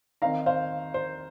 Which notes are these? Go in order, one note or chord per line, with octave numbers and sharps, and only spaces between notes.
D#3 C4 D#4 F5 A#5
C5 F5
C5